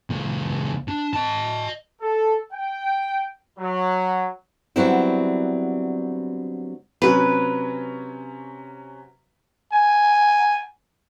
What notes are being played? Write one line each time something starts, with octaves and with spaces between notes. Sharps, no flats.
C#2 A#3
D4
D#5 A5
A4
G5
F#3
D3 F#3 G3 B3 C4 E4
C3 F#3 C#4 B4
G#5